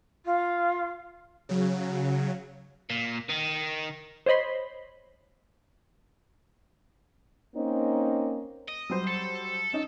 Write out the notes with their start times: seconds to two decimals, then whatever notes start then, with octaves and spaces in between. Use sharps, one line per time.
0.25 F4
1.49 C#3 F#3
2.90 A#2
3.30 D#3
4.26 C5 C#5 D#5 B5 C6
7.55 A#3 C4 C#4 D#4
8.68 D#5
8.90 F#3 G3 C5
9.07 A4
9.73 C#4 D#4